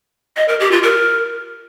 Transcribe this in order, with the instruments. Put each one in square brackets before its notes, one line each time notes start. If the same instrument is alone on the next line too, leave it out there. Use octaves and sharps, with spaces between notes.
[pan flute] D#5
A#4
G4
F4
A#4